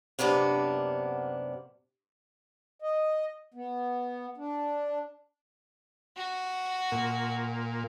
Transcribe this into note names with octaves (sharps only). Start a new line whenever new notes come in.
F#2 C3 A#3 B3 D4
D#5
B3
D4
F#4
A#2